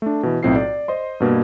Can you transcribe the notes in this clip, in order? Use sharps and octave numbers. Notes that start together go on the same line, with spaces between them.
A3 D4
B2 E3
B1 A2 C4 F4 C7
D5
C5 D#5 C6
G2 B2 A#3